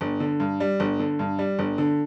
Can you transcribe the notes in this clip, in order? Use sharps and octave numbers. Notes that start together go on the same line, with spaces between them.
G1
D3
G2
G3
G1
D3
G2
G3
G1
D3